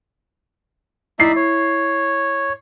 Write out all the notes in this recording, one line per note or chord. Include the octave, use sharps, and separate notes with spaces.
D#4 E4 D5 E5 C7
C#5